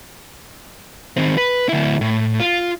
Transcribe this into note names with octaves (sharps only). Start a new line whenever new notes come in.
D#3 C4
B4
D2 E4
A2
F4